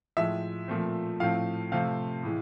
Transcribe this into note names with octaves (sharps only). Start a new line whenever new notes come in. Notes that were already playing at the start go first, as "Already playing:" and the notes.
A2 F3 G#3 E5
A#2 F3 A3 C4
A2 F3 A3 C4 F5
C3 F3 A3 C4 F5
A2 E3 G#3